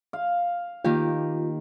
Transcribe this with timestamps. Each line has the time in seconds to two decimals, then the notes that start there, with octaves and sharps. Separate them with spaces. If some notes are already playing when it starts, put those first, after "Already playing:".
0.13 F5
0.85 D#3 A#3 F4 G4